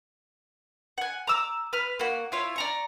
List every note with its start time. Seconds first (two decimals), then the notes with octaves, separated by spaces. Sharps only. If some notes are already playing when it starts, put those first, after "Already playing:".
0.98 F#5 G#5
1.27 A#5 D6 E6
1.73 B4 F6
1.99 A#3 F#4
2.32 E4 F4 C#5
2.56 D5 A#5 C#6